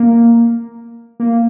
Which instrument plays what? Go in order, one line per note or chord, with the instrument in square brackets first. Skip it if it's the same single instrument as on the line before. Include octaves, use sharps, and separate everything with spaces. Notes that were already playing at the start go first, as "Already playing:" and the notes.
Already playing: [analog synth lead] A#3
A#3